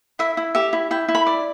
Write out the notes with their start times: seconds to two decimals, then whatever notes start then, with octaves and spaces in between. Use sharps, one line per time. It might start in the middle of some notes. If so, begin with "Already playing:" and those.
0.19 E4 E5
0.37 E4
0.55 G4 E5
0.73 E4
0.91 E4 G5
1.08 E4
1.15 B5
1.26 D5